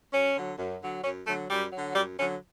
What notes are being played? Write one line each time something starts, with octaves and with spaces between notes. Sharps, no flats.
F#2 C#4
D3 F#3
F#2
D3 F#3
F#2 C#4
D3 F#3 A3
F#2 G3
D3 F#3
F#2 G3
D3 F#3 C#4